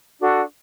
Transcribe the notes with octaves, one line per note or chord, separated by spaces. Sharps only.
D4 F#4 A4